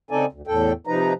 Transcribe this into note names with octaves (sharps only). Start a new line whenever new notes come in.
C#3 C4 D#4 A4 D5 G#5
D2
E2 A2 A4 G5
C3 F3 D#4 B4 A#5